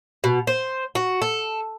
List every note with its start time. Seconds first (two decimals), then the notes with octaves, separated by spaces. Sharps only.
0.24 B2
0.47 C5
0.95 F#4
1.22 A4